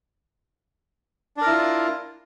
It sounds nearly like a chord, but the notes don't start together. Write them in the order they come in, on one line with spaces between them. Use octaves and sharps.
D4 A#4 E4 F4